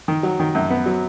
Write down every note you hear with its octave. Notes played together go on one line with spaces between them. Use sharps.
D#3
F#3
D#3
F#2
B3
F#3